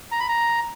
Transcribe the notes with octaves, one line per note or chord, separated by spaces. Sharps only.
A#5
B5
A#5